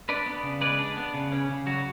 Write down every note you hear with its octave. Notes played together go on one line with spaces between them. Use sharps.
D4 B4 D5
B3
C#3
G#3 B4 D5
D4
B3
C#3
C#4
C#3
F#3 F#4